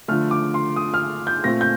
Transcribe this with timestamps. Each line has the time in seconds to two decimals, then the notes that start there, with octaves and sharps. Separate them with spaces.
0.08 D3 F3 A3 F6
0.31 D6
0.54 C6
0.76 D#6
0.94 F6
1.27 G6
1.44 A#2 A3 C4 A#6
1.61 G6